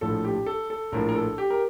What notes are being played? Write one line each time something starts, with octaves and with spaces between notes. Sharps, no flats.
A#1 A2 F3 A4
G4
A4
A4
A#1 A2 F3 A#4
A#4
A4
G4
A#4